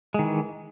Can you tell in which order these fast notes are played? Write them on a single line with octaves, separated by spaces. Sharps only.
G#3 D#3 E3